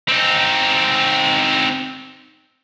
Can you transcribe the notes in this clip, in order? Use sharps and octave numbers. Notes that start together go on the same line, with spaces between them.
C4 D#4